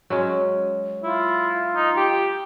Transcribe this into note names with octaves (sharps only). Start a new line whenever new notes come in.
F#3 G#3 C#4
E4 F4
D#4
G4